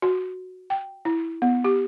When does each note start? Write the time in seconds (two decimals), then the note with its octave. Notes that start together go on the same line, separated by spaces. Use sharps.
0.02 F#4
0.70 G5
1.05 E4
1.42 B3
1.64 G4